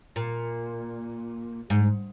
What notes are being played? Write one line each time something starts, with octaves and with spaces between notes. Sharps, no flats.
A#2
G#2